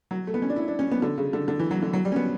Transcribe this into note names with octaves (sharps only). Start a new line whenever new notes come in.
F#3
A3
B3
C#4
D4
E4
D4
C#4
B3
D3
C#3
D3
D3
E3
F#3
D3
F#3
G3
C#4
B3